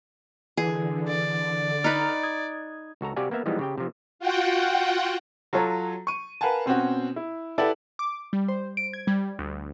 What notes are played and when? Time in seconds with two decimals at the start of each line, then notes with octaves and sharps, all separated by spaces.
0.57 D3 E3 G#4
1.08 D5
1.84 D#4 B4 A#5 F6
2.23 D#6 G#6
3.01 C#2 F#4 A4 A#5
3.16 C3 F#4 G4 D5 F5 G#5
3.31 A#3 B3 E5 F5
3.46 E3 F3 G3 G#3 B3 D#4
3.59 C#3 G4 G5
3.78 C3 F3
4.19 F4 F#4 F#5 G5
5.53 F#3 F4 A4 C#5 A#5
6.07 C#6 D#7
6.41 A#4 B4 F5 F#5 G#5 A5
6.66 B2 C4 C#4 F#4
7.16 E4
7.58 E4 G4 A4 B4 D5 F#5
7.99 D6
8.33 G3
8.48 C5
8.77 D7
8.93 G#6
9.07 G3
9.39 D2